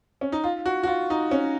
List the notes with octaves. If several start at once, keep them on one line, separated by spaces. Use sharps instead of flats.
C#4
D#4
F4
F#4
F#4
F4
D#4
C#4